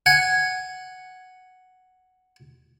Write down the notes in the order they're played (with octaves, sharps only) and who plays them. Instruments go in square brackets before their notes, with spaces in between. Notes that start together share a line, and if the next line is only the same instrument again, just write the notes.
[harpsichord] F#5 G#5